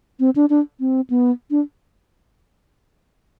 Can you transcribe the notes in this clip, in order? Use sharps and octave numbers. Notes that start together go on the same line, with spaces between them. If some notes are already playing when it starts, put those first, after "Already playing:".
C4
D4
D4
C4
B3
D4